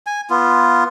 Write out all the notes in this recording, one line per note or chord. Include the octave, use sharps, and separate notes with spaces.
G#5
B3 F4